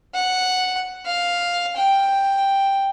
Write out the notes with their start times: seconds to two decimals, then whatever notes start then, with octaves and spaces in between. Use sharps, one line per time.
0.14 F#5
1.05 F5
1.76 G5